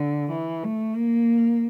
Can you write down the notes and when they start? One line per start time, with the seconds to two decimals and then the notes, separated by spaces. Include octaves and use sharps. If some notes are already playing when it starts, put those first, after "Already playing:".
Already playing: D3
0.32 E3
0.63 A3
0.95 A#3